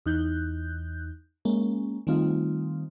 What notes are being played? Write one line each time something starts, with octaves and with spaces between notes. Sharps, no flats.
E2 D#4 F#6 G6
G#3 A#3 C#4
D#3 G3 A3 C4 D#4 F4